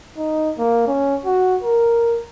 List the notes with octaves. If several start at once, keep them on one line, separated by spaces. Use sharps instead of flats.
D#4
A#3
C#4
F#4
A#4